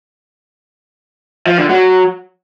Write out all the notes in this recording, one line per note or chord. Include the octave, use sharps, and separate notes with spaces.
F3
D3
F#3